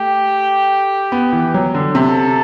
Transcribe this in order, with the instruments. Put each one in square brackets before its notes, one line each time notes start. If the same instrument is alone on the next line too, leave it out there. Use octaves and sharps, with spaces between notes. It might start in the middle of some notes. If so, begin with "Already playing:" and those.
Already playing: [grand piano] A3 [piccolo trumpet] G4
[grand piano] B3
E3
F#3
D3
[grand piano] C3 [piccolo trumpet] A4